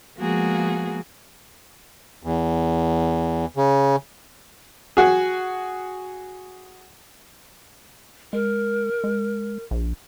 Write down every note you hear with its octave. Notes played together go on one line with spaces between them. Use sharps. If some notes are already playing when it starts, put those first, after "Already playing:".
F3 G#3 A#3 B3 F#4 G#4
E2
C#3
F#4 G#4
G#3 A#4
G#3
A#1